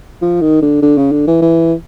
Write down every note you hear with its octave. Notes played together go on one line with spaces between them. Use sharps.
F3
D#3
D3
D3
C#3
D3
E3
E3